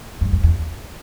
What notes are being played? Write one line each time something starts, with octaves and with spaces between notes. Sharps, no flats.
F#2
F2
E2